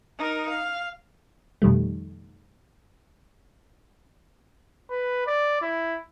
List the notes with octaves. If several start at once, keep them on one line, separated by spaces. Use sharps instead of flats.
D#4 A#4
F5
F2 B2 D#3 G3 A3
B4
D5
E4